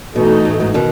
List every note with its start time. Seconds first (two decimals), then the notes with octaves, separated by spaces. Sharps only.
0.15 B2 E3 A3 D#4 F#4 A4
0.45 A2
0.60 G#2
0.74 B2 D#3